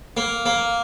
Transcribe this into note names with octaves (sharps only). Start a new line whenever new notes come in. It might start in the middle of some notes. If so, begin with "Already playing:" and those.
A#3
A#3